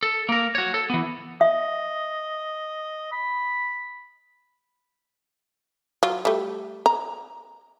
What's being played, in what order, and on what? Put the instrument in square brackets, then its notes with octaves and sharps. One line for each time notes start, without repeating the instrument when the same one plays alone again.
[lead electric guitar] A4
A#3 A#4
F#4 C#5
A4
E3 B3
[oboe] D#5 [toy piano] E5
[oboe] B5
[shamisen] F#3 F4
G3 A3
A#5